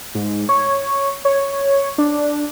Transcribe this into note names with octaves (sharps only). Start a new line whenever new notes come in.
G#2
C#5
C#5
D4